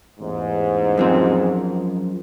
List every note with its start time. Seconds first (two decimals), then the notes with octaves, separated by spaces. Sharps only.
0.20 A1 E2 G#2
0.97 F#2 F3 C4